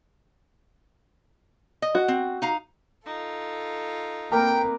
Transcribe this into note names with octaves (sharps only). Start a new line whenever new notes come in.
D#5
F#4
C4
D#4 F5 A#5
D#4 F4 A4
A#3 C4 A#4 B4 G5 D6